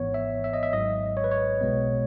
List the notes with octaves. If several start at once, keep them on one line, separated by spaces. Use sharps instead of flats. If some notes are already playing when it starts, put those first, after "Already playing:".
Already playing: G#1 G#2 E3 B3 C#5
E5
E5
D#5
E5
G#1 G#2 F#3 D#5
C#5
B4
C#5
B1 B2 G#3 B3